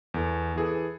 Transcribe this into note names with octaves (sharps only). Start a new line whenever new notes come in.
E2 A4
E3 G#4 A4